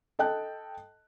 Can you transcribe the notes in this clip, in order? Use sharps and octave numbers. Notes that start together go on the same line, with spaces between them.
A4 D#5 G5 A5 F#6